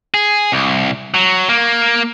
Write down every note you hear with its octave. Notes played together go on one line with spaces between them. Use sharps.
G#4
C2
F#3
A#3